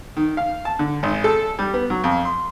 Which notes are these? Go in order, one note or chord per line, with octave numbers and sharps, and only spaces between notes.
D#3
F5
A5
D3
G#1
A4
G3
B3
F#3
F2
C6